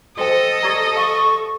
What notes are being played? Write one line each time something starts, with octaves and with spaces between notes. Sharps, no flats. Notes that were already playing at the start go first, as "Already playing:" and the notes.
F#4 A4 C5 D#5 G5
G4 D5 A#5
F5 C#6